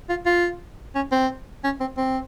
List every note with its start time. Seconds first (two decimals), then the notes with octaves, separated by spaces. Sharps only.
0.10 F4
0.26 F4
0.95 C#4
1.12 C4
1.64 C#4
1.80 C4
1.98 C4